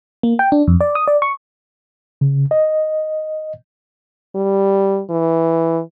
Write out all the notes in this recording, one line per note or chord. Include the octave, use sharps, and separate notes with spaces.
A#3
G5
D4
F2
D5
D#6
D5
C#6
C#3
D#5
G3
E3